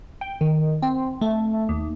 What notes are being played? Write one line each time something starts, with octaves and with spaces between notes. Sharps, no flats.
G5
D#3
C4
A3
D#2